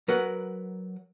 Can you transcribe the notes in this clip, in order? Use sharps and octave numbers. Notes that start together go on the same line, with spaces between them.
F#3 A#4 B4 F#5